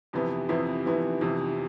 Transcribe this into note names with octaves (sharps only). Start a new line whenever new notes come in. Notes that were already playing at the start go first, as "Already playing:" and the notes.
F2 C3 E3 B3 E4
F2 C3 E3 B3 E4
F2 C3 E3 B3 E4
F2 C3 E3 B3 E4